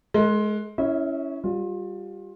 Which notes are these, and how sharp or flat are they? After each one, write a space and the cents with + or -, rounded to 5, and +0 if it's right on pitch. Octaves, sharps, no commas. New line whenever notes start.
G#3 +25 A#4 -25
C#4 +0 E4 +0 E5 -45
G3 +0 F4 +25